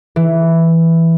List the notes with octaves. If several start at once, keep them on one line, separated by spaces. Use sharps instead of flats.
E3